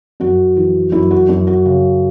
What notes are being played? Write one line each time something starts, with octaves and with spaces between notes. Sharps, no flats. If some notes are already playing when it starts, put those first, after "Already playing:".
F#2 F#4
E3
F#2 E4
F#4
F#2 E4
F#4
C#3